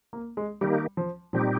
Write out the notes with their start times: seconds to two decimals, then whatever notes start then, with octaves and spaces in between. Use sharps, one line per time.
0.13 A#3
0.37 G#3
0.61 D#3 G3 A#3 D#4 G4
0.97 F3
1.33 A#2 F3 G3 C4 D#4 G4